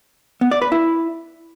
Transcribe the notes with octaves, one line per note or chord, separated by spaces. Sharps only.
B3
D5
B4
E4